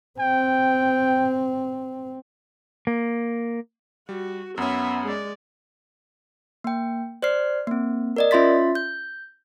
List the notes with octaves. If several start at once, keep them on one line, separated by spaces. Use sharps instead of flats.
C4 G5
A#3
G3 F#4
F#2 B3 C#4 E5
G#3 D5
A#3 G5
C5 D5 F6 C7
A#3 C4
A#4 D5 D#5
C#4 F4 E5 C6 A6 B6
G6